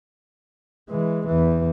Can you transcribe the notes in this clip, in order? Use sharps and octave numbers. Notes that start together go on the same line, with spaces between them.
E3 G#3
E2 E3